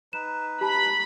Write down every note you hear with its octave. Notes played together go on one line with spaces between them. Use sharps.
D#4 B4 E7
G4 A5 B5